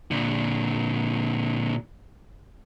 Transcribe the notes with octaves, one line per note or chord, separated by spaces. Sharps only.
A#2 D3